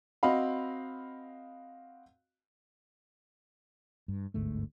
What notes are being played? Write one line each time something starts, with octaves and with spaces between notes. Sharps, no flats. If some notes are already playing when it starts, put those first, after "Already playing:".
C4 F#4 D#5 F5 B5
G2
G1 D2 G#2 A3